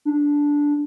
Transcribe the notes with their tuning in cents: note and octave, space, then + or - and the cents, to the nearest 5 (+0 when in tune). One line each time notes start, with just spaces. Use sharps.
D4 -10